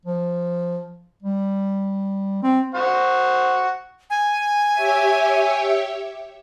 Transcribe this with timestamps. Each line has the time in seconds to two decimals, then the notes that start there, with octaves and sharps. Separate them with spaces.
0.06 F3
1.23 G3
2.43 C4
2.75 C5 F#5 C#6
4.10 G#5
4.73 G4 C#5 E5